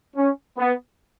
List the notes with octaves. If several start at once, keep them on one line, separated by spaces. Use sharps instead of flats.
C#4
B3